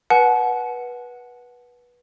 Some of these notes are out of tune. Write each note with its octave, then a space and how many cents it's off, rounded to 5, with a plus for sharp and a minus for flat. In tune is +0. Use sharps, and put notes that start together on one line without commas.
B4 -20 F#5 +0 A5 -45